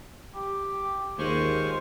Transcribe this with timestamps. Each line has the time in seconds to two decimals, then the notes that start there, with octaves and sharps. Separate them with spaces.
0.35 G4
1.19 D#2 G#3 F4 C5 C#6